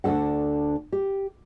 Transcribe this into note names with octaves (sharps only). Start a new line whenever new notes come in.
D2 D4 A4 F#5
G4